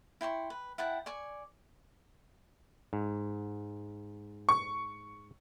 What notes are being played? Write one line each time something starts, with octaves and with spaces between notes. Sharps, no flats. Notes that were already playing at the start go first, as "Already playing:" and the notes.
E4 G5 C6 C#6
B4
E4 F#5 G5 A5
D5 G#5 C#6
G#2
C#6